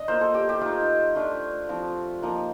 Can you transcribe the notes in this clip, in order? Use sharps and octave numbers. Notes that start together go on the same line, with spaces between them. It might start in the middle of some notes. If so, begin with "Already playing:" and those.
Already playing: D4 D#5
A#3 F4 C5
A4
G4
G4
A3 D#4 F4
A3 D4 F4
F3 C4 F4
F3 A#3 D#4